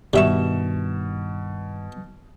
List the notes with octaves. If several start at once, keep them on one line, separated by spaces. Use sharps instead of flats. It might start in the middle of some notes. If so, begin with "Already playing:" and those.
G2 B2 D#3 G3 E5 C#6 E7